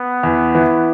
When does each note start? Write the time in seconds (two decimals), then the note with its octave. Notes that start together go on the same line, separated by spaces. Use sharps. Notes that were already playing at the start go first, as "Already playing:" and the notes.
Already playing: B3
0.23 E2
0.55 E3